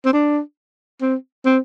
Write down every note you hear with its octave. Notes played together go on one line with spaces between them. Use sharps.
C4
D4
C4
C4